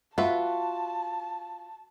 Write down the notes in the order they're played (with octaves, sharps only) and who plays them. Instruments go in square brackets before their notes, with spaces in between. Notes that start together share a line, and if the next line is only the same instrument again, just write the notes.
[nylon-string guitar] F4 [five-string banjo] F#4 B4 E5 [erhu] A5